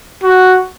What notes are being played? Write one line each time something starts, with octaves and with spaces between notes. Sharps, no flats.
F#4